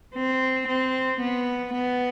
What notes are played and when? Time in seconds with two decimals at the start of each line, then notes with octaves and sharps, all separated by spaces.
0.15 C4
0.68 C4
1.21 B3
1.74 B3